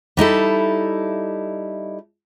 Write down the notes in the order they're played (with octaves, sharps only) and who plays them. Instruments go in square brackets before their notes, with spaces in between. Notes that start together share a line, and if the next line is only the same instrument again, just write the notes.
[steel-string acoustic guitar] G3 D#4 E4 A4